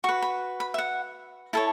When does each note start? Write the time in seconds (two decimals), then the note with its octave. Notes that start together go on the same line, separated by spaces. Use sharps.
0.04 F#4 C#6
0.09 B4
0.22 B5
0.60 B5
0.74 E5
0.78 F#5
1.53 E4 A4 C#5 A5